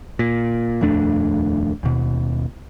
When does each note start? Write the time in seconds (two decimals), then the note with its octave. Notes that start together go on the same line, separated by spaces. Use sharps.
0.19 A#2
0.81 D#1 F2 A3 D4
1.83 D#2 B2